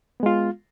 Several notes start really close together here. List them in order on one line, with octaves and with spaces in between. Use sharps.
B3 G#3 F4